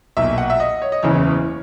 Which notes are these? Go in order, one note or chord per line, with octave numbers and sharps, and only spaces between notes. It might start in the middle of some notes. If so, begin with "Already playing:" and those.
B1 A#2 E5
F#5
E5
D#5
C#5
D#5
F#1 E2 C#3 E3 C#5